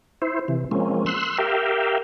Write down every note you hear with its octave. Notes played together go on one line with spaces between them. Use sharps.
E4 C5
C3 E3
F3 G#3 A#3 C4 C#4
C6 E6 F#6
G4 A#4 E5 F5 G5